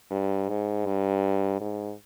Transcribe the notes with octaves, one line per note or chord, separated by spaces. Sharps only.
G2
G#2
G2
G#2